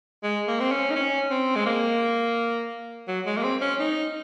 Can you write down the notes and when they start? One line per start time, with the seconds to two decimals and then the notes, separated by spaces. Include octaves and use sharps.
0.23 G#3
0.48 A#3
0.60 C4
0.71 C#4
0.90 D#4
0.95 C#4
1.31 C4
1.55 G#3
1.66 A#3
3.08 F#3
3.26 G#3
3.37 A#3
3.44 C4
3.61 C#4
3.79 D#4